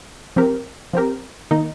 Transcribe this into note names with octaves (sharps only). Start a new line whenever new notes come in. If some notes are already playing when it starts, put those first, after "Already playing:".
F3 C4 G4 A#4
F3 C4 G4 A#4
D#3 A#3 D#4